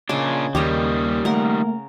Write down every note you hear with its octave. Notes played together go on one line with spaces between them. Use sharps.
A#2 C#3 D4 C#5 D#5
D#2 D#3 G3 A#3 G4 C#5 D#5
A3 A#3 A#4 F#5